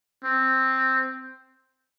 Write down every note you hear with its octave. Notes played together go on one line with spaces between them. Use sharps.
C4